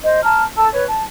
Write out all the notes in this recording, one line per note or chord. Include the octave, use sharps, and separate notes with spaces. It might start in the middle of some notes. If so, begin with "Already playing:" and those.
C5 D#5
A5 A#5 F6
A4 A5 E6
B4 C#5
A5